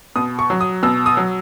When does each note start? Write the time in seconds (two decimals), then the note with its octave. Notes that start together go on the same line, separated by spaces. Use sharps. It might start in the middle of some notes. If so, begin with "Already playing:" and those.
0.16 B2 D#6
0.39 C#6
0.50 F#3
0.61 D#6
0.83 B2 E6
1.06 D#6
1.17 F#3